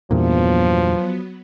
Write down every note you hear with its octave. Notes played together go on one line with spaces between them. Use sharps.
E2 G2 A#2 F3 F#3 B3